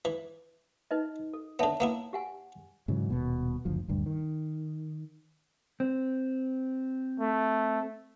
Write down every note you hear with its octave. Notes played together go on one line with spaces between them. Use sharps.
E3
D#4 B4 D#5
A4
D3 B3 C#5 E5 A5
A#3 B3 E4
G4 F#5 G#5
G#2 C#3 E3 F#3
D#1 B2
F#1 D2 F3
D#1 D2 G2
D#3
C4
A3